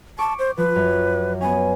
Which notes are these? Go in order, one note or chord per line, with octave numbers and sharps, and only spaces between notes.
A5 C#6 D6
C5
F3 B4
F#2
B3 C#4 G#5